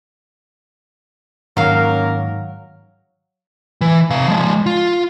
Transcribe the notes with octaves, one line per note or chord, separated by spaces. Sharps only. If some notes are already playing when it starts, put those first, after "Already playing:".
G#2 D#3 F#3 A#3 C#4 A#4 F5
E3
C3 F5
F3 G#3
F4